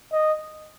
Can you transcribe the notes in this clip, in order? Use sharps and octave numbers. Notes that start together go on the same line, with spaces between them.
D#5